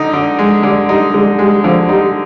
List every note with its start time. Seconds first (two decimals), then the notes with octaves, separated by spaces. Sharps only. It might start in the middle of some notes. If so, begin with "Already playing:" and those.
Already playing: D3 D#4
0.13 D3
0.39 G#3
0.63 D3 G3
0.89 G3 D#4
1.14 D3 G#3
1.39 G3 G#3
1.64 D3 F3
1.89 G3 D#4